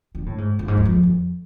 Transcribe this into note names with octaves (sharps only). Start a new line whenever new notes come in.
D3
A2
G#2
G2
G#2
E2
F2
F2